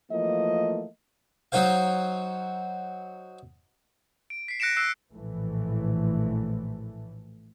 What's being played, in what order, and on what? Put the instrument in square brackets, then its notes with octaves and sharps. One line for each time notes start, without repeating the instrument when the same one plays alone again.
[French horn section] E3 F3 A3 A#3 D#5
[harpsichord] F#3 D#4 F#4 C5 F5
[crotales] D7
B6 C7
F#6 A#6 C#7 D7 E7
E6 F#6 C7 D7 E7
[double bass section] A#1 A2 E3 A3